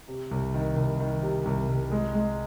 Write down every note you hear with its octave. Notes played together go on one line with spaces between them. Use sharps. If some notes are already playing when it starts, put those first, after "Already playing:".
C3
C2
D#3
C2
D#3
C3
C2
C2
G#3
G#3